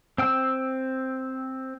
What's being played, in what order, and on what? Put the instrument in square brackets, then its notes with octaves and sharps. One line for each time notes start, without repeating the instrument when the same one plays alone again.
[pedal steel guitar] C4 G5 E6